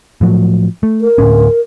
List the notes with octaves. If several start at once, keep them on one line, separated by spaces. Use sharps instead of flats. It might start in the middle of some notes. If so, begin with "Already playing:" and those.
A2 F3 F#3
A3
A#4
D2 A2 C#4